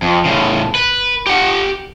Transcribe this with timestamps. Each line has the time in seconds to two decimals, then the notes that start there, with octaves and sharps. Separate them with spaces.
0.02 F2
0.25 A2 C#3
0.75 B4
1.27 G4 F#5